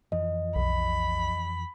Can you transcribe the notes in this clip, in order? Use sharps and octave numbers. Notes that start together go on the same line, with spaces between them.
F2 E3 F3 D#5
B1 B5